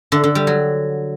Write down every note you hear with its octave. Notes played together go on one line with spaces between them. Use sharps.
D3
D3
G3
F#3